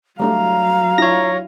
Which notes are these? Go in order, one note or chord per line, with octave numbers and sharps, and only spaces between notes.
F#3 G3 A3 D4 F5 A#5
D4 E4 F4 C#5 A#6